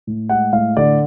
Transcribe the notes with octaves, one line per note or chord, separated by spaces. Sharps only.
A2
G#3 F#5
A2 F5
D3 D5